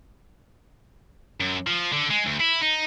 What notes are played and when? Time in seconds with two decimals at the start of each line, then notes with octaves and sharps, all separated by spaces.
1.41 F#2
1.67 F3
1.92 D3
2.10 G#3
2.26 D2
2.40 E4
2.62 D#4